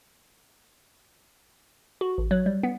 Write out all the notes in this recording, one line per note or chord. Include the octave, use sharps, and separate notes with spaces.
F#4
A1
F#3
G3
B3